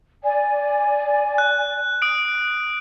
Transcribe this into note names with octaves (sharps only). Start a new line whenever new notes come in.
D5 G#5
F#6
D#6 D7